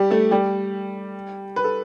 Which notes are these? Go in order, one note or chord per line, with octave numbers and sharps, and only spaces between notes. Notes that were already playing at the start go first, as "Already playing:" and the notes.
Already playing: G3 G4
A3 A4
G3 G4
B4
A4